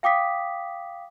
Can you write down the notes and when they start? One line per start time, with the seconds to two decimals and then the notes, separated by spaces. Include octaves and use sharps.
0.03 F5 G5 D6 D#6 B6